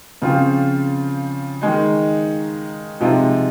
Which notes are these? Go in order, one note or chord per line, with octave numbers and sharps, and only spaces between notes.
C#3 F3 C4 F4
D#3 G#3 D#4
C3 F3 G#3 D#4